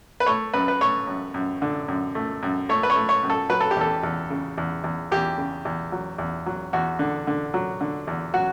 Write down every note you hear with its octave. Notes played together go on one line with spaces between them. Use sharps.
B4
A3 C#5
F#2 B4
B4
A3 C#5
F#2
F#2
D3
F#2
A3
F#2
A3 C#5
B4
C#5
A3
C#5
F#2
A4
F#3 B4
A4
G4
E2 A4
E2
C#3
E2
E2
E2 G4
C#3
E2
F#3
E2
F#3
E2 F#4
D3
D3
F#3
D3
E2
F#3 F#4